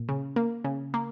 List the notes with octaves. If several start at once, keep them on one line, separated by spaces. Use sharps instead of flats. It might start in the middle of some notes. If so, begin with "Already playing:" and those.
Already playing: A#2
C#3
A#3
C#3
A#3